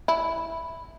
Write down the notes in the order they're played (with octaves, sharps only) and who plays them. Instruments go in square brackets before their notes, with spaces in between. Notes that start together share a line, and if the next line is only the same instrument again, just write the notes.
[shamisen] E4